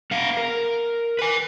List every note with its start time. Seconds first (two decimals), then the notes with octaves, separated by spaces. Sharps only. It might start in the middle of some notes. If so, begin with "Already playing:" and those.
0.11 B3 F5
0.37 A#4
1.19 B4 G#5